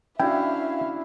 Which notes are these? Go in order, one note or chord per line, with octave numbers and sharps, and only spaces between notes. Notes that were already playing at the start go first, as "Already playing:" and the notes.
C#4 D4 E4 F#4 E5 F5 G5